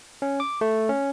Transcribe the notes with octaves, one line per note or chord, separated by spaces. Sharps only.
C#4
D6
A3
C#4